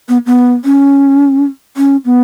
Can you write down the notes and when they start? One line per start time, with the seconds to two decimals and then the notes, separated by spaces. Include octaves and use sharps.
0.09 B3
0.26 B3
0.65 C#4
1.77 C#4
2.05 B3